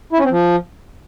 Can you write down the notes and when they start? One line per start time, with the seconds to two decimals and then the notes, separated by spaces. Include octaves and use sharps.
0.13 E4
0.19 C#4
0.25 C4
0.31 F3